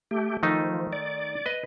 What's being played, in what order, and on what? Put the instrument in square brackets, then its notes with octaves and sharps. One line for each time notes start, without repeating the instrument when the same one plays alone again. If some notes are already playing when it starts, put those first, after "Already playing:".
[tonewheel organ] A3 G4
[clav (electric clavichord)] D#3 A3 D#4 [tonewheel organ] F3
[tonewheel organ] D5
[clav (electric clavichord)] B4 D#5